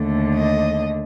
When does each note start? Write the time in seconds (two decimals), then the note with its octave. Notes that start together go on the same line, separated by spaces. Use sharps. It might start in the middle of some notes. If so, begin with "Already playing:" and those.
Already playing: D#2 D3 A3
0.34 D#5